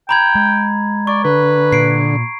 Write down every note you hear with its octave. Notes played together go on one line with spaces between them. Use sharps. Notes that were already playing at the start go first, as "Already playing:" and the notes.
G5 A#5 B5 G#6
G#3
D5 C#6
D3 B4
A#2 C7 D7